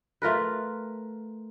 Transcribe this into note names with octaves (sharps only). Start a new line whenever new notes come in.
A3 F4 A#4 B4